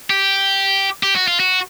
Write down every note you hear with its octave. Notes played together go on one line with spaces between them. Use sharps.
G4
G4
F#4
F4
F#4